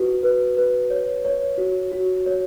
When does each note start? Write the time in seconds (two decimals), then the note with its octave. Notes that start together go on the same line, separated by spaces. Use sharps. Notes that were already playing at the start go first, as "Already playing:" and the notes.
Already playing: F#4 B4
0.23 B4
0.57 B4
0.90 C#5
1.25 C#5
1.58 F#4
1.92 F#4
2.26 C#5